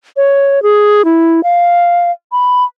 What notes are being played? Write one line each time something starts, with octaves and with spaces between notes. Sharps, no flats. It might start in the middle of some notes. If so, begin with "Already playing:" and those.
C#5
G#4
E4
F5
B5